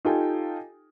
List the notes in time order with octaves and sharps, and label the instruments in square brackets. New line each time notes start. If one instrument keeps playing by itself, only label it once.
[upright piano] D#4 F4 G4 A4 G5 G#5